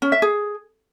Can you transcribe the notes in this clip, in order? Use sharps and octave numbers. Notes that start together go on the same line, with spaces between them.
C#4
E5
G#4